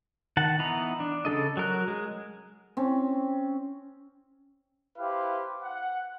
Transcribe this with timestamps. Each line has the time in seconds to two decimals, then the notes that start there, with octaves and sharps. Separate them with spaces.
0.37 D#3 F#5 A5
0.59 E3 B3 D#4 A#5 B5
1.00 D4
1.25 C#3 G3 A4 D#5
1.57 F#3 A#4 F#6
1.88 G#3
2.77 C4 C#4
4.98 E4 G4 B4 C5 F5
5.63 F#5